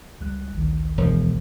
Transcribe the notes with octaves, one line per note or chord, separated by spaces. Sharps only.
C#2 G3 F#6
A1 D2 D#3
E1 F3